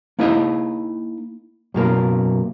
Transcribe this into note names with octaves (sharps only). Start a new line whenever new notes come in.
A#3 D#4 E4 D#5 E5
F#2 B2 A#3